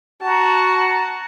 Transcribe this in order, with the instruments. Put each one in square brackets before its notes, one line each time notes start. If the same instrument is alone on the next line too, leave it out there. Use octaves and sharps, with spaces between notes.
[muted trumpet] F#4 [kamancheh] A5 A#5